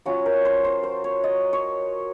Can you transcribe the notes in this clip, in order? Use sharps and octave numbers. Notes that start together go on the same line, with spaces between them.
F#3 C#4 F4 F#4
A#4
C5
C5
C5
C#5
D#5
C#5